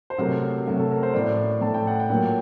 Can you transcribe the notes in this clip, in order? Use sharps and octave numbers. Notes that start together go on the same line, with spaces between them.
C5
C3 F#3 A3 A#4
C3 F#3 A3
A4
A#4
C5
A2 A3 D5
A2 A3 A5
G5
F#5
G5
A#2 F#3 A#3